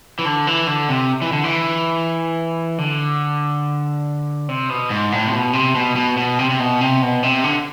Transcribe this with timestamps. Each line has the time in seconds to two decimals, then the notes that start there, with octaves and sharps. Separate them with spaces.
0.19 E3
0.25 D3
0.47 E3
0.67 D3
0.89 C3
1.22 E3
1.32 D3
1.44 E3
2.78 D3
4.49 C3
4.69 B2
4.90 G#2
5.12 A2
5.26 C3
5.33 B2
5.53 C3
5.75 B2
5.96 B2
6.17 B2
6.39 C3
6.50 C3
6.59 B2
6.81 C3
7.02 B2
7.23 C3
7.44 D3